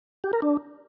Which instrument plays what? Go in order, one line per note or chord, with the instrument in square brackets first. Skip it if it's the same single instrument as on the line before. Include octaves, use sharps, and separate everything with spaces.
[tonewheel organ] G4
A#4
D4